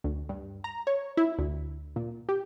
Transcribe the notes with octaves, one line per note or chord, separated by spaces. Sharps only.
D2
G2
A#5
C#5
E4
D2
A#2
G4